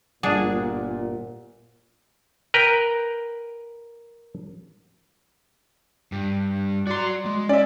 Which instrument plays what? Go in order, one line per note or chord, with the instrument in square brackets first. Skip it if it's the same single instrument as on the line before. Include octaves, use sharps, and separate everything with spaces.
[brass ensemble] G1 A#2 [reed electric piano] G2 F#5 [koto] D4 G#4
[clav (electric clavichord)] A#4 B4 G5 A#5
[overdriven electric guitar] G2
[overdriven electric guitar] F#4 A#5 [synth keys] D5 C6
[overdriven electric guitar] G#3
[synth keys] C#4 E5 [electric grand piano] D5